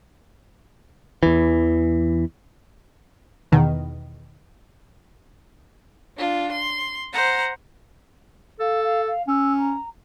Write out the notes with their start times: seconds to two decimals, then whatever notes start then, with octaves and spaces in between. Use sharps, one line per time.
1.23 E2 E3
3.52 E2 B2 D#3
6.18 D4 F4
6.51 C6
7.12 C5 F#5 A#5
8.60 A4 F5
8.83 F5
9.07 F5
9.28 C#4 E6
9.57 A#5